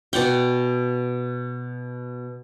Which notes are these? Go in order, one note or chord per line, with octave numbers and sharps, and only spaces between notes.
B2 D5 F#5 G5